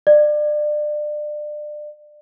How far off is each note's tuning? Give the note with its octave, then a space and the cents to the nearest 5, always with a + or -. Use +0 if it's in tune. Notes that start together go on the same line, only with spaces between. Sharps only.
D5 +30